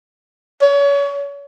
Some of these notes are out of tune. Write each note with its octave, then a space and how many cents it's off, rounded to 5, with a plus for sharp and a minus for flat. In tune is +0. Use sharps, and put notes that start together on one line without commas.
C#5 +30